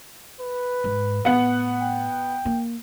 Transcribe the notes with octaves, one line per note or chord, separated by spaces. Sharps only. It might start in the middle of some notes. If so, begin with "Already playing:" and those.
B4
G#2
A2 B3 F#5
G5
A#3